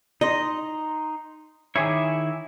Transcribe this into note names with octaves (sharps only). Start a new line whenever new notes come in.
D#4 D#5 C6
D#3 E4 G#4 C#5 E5 D6